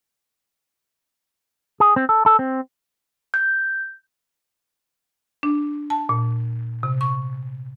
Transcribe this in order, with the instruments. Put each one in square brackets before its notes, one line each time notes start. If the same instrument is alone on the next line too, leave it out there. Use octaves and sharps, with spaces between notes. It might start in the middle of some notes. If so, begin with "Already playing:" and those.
[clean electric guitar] G#4
C4
A4
A4
C4
[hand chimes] G6
[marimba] D4
A5
A#2
C3
C#6